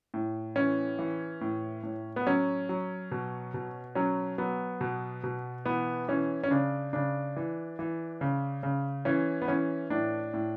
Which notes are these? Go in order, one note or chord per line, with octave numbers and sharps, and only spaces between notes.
A2
E3 C#4
E3
A2
A2
B3
F#3 C#4
F#3
B2
B2
F#3 C#4
F#3 B3
B2
B2
E3 B3
E3 C#4
C#4
C#3 D4
C#3 D4
E3
E3
C#3
C#3
E3 C#4
B3
E3 C#4
A2 D4
A2